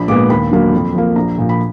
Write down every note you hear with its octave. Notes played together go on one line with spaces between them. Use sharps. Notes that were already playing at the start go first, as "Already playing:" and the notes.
Already playing: A#1 B5
A#2 G#3 B3 D6
D#2 B5
D3 F#3 A#3
F2
F3 A#3
A#1 A#5
A#2 F3
B5